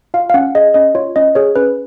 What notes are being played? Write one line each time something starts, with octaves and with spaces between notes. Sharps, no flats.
F4 F5
F5
C#4 F#5
G#4 D#5
C#4 D#5
F4 C#5
C#4 D#5
G#4 C#5
C#4 B4